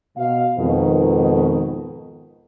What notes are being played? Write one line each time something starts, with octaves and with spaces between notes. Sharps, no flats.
B2 F5
F2 G#2 B2 D#3